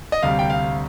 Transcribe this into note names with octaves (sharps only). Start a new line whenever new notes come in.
D#5
D2 C3 G3 F5
G5
F5